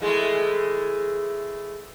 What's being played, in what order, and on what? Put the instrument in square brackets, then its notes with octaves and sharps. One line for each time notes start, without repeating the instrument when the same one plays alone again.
[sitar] E3 G#3 A3